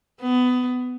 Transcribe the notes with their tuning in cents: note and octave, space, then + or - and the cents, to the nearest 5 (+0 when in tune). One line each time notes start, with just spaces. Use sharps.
B3 +20